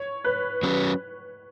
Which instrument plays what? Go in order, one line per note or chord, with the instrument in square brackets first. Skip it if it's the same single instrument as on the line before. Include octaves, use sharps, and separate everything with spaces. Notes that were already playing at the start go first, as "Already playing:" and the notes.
Already playing: [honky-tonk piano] C#5
B4
[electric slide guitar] F#3 C#4 B4